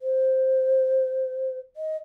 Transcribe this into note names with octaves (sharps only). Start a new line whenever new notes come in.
C5
D#5